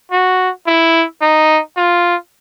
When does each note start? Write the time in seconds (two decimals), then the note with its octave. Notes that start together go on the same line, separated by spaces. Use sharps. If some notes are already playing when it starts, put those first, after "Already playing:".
0.11 F#4
0.67 E4
1.21 D#4
1.77 F4